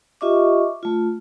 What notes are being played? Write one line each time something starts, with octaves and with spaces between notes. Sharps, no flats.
F4 G4 D#5 E5 C#6 D6
A3 F4